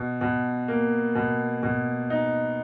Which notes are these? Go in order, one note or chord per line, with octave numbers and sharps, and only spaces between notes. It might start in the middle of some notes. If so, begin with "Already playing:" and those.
Already playing: B2
B2
A#3
B2
B2
D#4